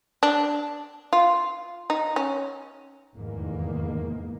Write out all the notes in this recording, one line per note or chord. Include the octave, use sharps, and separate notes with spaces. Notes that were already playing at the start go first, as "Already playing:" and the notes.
D4
F4
D#4
C#4
F1 E2 G#2 D#3 E3 A#3